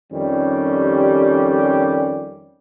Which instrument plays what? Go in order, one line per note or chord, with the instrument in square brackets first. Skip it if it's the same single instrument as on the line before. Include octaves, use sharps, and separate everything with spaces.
[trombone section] F2 D#3 G3 C#4 G4